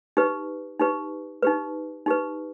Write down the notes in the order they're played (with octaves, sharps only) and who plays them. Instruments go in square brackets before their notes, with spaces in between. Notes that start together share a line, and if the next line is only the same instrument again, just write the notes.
[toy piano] D#4 G4 B4
D#4 G4 B4
D#4 G4 B4
D#4 G4 B4